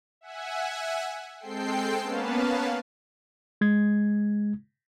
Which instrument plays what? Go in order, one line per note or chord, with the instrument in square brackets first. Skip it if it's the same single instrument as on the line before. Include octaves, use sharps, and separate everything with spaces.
[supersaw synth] E5 F#5 G#5
G#3 C4 A4 G5 C7
A#3 B3 C#4 B4 F5 A5
[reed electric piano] G#3 G#6